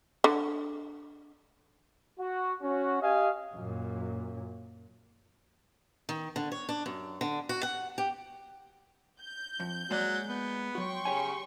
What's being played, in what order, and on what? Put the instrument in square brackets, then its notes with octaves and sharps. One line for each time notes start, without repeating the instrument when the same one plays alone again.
[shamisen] D3
[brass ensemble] F#4
C#4 F#4
G4 D#5 F5 G#5
[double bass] F#2 A#2
[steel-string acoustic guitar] D#3
D3
C#5
D4
F#2
D3
F#4
F#5
G4
[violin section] G6
[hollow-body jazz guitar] F2
[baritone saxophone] F#3 [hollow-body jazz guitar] G#3 A#3 D5
[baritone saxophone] B3
[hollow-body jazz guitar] F#3 F#4 [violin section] G5 C6 C#6
[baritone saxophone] C#3 [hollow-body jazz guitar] G4 C#5 G#5